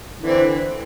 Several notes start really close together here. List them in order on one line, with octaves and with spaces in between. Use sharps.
D3 E3 C4